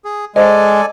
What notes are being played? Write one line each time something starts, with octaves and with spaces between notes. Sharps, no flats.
G#4
G#3 A4 C5 D5 D#5 G#5